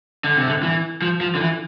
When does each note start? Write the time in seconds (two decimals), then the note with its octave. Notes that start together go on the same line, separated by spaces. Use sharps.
0.24 D3
0.36 C3
0.48 D3
0.63 E3
1.02 F3
1.21 F3
1.35 D3
1.41 E3